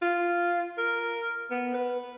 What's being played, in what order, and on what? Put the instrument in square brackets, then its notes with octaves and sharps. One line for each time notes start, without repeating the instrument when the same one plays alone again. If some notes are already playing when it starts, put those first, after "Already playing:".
[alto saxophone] F4
A#4
B3
B4